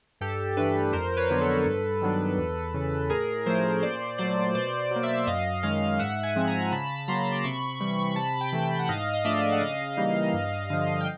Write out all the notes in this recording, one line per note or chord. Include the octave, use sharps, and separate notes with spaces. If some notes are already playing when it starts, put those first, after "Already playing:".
G2 G4 A4
E3 A3 D4 A4 B4
F2 A#4 C5
B4 C#5
D3 F#3 B3 D4
A4 B4
G2
D#3 F#3 B3 D4
E2
C#3 E3
A2 G#4 A#4
F3 A3 C#4 A#4 C5
A#2 C5 D5
F#3 A3 C5 D5
B2 C5 D5
F#3 A#3
D5 E5
F#2 D#5 F5
D#3 G#3 C#4 D#5 F5
G#2 E5 F#5
F#5 G#5
F3 G#3 C4
G#5 A#5
C#3 A5 B5
F#3 A#3 A#5 C6
D6
C3 B5 C#6
E3 G3 B5 C#6
C3 A5 B5
G5 A5
E3 A3
F#5
G#2 D#5 F5
D#5
F3 A3 D4 D5 E5
F#5
C#3 D#5 F5
E3 G3 A#3 D#4
G2
D3 F3
G5